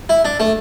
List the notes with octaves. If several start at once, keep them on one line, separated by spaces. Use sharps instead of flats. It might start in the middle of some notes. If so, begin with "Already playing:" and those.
E4
D4
A3